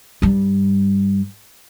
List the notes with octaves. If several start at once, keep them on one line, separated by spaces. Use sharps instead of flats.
G2 G3